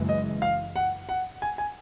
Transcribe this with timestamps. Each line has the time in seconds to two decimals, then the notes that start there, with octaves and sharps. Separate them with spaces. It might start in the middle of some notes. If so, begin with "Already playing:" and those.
Already playing: F#1 F#2 C#3 E3 G#3
0.09 D#5
0.42 F5
0.76 F#5
1.09 F#5
1.42 G#5
1.58 G#5